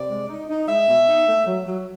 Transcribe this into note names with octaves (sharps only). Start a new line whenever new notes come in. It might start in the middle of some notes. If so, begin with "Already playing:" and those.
Already playing: C3 D5
G#3
D#4
D#4
G#3 E5
B2
D#4
A3
F#3
F#3